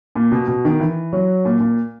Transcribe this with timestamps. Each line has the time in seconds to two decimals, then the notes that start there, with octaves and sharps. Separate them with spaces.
0.15 A#2
0.32 B2
0.48 B2
0.65 D#3
0.80 E3
1.13 F#3
1.45 A#2
1.60 A#2